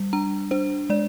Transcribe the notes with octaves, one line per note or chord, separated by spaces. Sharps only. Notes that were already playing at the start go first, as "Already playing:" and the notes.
Already playing: G3
D4 A#5
D4 C5
G#3 D5